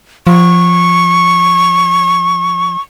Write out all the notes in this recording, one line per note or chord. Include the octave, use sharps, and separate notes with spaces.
F3 C#6